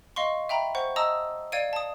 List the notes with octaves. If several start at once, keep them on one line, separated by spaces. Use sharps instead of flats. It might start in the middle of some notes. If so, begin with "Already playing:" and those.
D#5 F5 C6 C#6
E5 G5 A#5 B5
C5 F#5 C#6
D#5 A5 A#5 D#6 E6
D5 F5 G#6 D7 D#7
A5 D#6